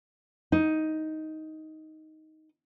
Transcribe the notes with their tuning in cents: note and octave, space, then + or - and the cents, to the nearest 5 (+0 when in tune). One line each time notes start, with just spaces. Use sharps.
D#4 +10